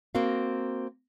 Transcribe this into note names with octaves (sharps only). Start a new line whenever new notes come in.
A#3 C4 F#4 A#4 F5